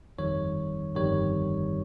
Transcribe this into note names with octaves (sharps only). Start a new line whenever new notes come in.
G1 F2 D#3 G3 C#5
G1 F2 D#3 G3 C#5